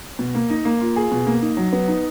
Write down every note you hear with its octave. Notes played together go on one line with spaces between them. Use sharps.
B2
A#3
D#4
A#3
F4
G#4
B2
A#3
D#4
F#3
B3
D#4